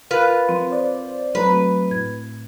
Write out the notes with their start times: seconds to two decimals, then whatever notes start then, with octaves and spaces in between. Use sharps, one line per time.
0.11 F4 A#4 B4 F#6
0.49 F3 C4
0.70 C5 D5
1.35 F#3 A3 C4 B4 A#5
1.91 A2 G#6